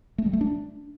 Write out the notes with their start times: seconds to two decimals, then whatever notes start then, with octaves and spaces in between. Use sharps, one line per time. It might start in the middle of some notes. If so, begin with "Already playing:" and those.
0.18 A3
0.26 G3
0.33 A3
0.41 D4